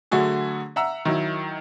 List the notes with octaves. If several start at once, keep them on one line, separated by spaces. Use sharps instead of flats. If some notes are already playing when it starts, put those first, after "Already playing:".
D3 F#3 A3 F#4 G#4
E5 F#5 A#5 E6
D#3 F#3 E4